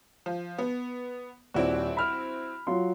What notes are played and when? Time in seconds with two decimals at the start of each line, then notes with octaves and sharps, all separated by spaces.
0.26 F3
0.58 B3
1.54 D#1 C4 E4 F#4 D5
1.97 B5 F6
2.67 F#3 F4 C6